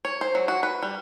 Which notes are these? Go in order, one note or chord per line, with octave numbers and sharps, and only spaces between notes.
C#5
C5
F#3
F#4
B4
G3